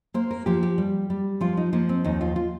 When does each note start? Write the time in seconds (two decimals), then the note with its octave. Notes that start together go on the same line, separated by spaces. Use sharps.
0.14 A#3 C5
0.31 A#4
0.46 F3 G4
0.63 G4
0.78 G3
1.10 G3
1.41 F3 F4
1.57 D#4
1.73 F3 A#3
1.89 C4
2.04 D#2 D#4
2.21 F4
2.36 F4